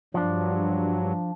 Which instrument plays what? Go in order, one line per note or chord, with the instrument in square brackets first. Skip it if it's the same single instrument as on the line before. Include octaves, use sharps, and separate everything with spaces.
[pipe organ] G2 F#3 [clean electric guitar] F3 D4